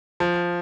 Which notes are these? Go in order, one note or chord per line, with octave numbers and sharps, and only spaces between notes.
F3